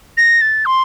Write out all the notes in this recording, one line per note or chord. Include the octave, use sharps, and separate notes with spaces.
A#6
A6
C6